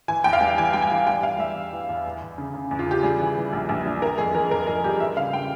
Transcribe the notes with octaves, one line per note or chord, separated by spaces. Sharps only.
E3 G#5
E2 G5
F5
G3
E3 G#5
G3 G5
G#5
E3
G3 G5
E2 F5
G3 E5
E2
E3
E2
E2
E2
C#3
C#3
E2
F4
C#3 G4
G3 G#4
E3
E3
A#1
A#1
G3
E3 A#4
F2 G#4
E3 A#4
F2 A#4
F2 G#4
G3 G4
E3 E5
C#3 F5
G3 G5